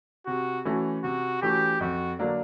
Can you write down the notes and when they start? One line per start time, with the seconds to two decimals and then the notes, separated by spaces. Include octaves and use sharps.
0.27 C3 F#4
0.65 E3 A3 C#4 F#4
1.04 C3 F#4
1.42 E3 A3 C#4 F#4 G4
1.81 F2 F#4
2.19 D3 F#3 A#3 D4